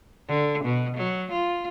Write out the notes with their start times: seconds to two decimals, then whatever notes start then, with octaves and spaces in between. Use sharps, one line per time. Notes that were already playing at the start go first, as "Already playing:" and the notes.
0.28 D3
0.64 B2
0.97 F#3
1.32 F4